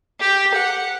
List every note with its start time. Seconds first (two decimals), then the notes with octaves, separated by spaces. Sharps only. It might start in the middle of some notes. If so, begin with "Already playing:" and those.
0.21 G4
0.55 F#5